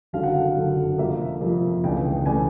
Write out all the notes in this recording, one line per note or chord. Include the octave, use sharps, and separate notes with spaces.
F#1 F#2 D3 F#3 F5
F#5
F5
F#1 F#2 D3 F#3
F2 C3 F3 A#3 E5
F2 C3 F3 A#3
C#2 C#3 E3 A3 D4 G5
C#3 E3 A3 D4 G#5